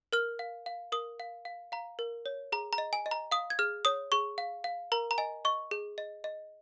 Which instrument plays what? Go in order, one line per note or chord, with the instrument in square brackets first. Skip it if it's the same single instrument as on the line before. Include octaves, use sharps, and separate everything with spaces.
[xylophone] A#4 F6
F5
F5
A#4 D#6
F5
F5
F5 A#5
A#4
C#5
G#4 A#5
A#5
D#5
G#5
D#5
A#5
F5 D#6
G#6
G#4 F6
C#5 D#6
G#4 C#6
F5
F5
A#4 A#5
A#5
D#5 G#5
D#5 C#6
G#4
D#5
D#5